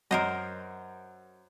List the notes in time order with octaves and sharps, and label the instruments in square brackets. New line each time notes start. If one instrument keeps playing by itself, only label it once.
[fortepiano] F#2 [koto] A#4 C5 D#5